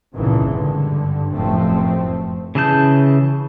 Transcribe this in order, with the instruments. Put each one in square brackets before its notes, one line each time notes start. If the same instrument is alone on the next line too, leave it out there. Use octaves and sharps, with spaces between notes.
[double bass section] G#1 C#2 A#2 C#3 E3
G2 D3
F1 F#2 A2 F3 A3 C4
[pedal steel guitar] C#3 E3 G#4 A5 G6